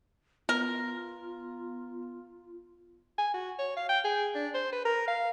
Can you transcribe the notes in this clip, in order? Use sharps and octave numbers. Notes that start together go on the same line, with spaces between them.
B3 F4 A#4
G#5
F#4
C#5
F5
G5
G#4
D4
C5
B4
A#4
F5